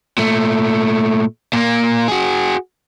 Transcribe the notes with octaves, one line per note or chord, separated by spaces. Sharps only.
A#2 A3
A#2 A#3
F#4 G#4